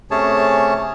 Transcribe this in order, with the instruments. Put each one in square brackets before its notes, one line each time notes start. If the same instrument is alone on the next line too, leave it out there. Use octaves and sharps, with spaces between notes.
[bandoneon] C3 A3 C#4 G#4 C#5 A5